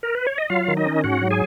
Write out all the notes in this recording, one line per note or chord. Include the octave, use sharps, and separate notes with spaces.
A#4
B4
C#5
D#5
F#3 F4 F5
D#3
D#4 D#5
C#4
G#2 F#4 F#5
F#3
G#4 G#5